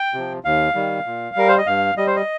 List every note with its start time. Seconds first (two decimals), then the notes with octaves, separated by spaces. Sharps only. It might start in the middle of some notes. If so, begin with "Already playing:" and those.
Already playing: G5
0.14 C3 F3
0.44 D#2 F5
0.75 D#3 G3
1.06 A#2
1.36 G3 A#4
1.48 C5
1.58 D#5
1.67 G2 F5
1.97 G3 D#5
2.07 C5
2.16 D#5